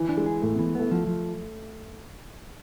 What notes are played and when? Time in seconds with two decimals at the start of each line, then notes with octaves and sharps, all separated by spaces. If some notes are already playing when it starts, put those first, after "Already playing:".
Already playing: E3
0.09 D4
0.17 G#3
0.26 G#4
0.42 A2 A3
0.55 E3 B3
0.75 A3 B3
0.91 F3
1.07 F3